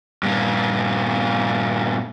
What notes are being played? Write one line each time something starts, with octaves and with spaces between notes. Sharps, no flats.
G2 A#2